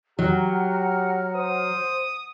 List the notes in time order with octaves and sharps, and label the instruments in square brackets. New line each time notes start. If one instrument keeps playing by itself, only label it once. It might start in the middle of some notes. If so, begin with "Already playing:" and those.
[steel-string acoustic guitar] F#3 [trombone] G4 [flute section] F#5 A#5 F6
[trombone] C5 [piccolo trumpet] D#6